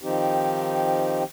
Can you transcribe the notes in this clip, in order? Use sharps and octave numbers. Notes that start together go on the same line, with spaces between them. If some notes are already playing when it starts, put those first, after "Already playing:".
D#3 F3 C4 D#4 G4